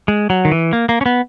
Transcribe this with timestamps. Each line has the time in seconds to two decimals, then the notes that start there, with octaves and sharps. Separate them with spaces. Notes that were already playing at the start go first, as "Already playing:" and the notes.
0.08 G#3
0.30 F#3
0.45 D#3
0.52 E3
0.73 A#3
0.89 A#3
1.01 C#4
1.06 B3